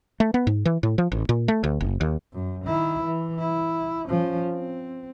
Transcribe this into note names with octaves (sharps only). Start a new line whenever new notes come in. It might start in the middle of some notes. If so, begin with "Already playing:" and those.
A3
B3
G#2
E3
A2
F3
A1
A#2
A3
D2
F#1
D#2
F#2
D#3 E4
E3
E4
F3 C#4
C4